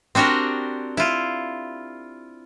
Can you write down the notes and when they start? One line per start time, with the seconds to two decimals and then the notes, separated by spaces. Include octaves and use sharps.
0.15 C4 D4 F#4 G4 A#4
0.97 E4 F4